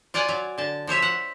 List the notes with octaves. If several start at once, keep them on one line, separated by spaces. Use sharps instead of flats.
F4 D5 F#5 G#5
F#3
D3 A5
F3 C5 C#5 E5
F#5